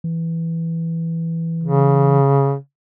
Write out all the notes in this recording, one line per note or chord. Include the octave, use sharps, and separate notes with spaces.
E3
C#3